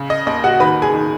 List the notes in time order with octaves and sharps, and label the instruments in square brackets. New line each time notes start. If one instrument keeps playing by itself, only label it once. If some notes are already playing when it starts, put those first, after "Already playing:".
Already playing: [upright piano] C#3
D#5
D#2 D#5
F#4 F#5
D#3 B4 B5
G#4 G#5
D#3